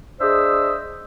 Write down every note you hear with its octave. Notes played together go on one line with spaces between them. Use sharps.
D4 G#4 C5 D#5 E5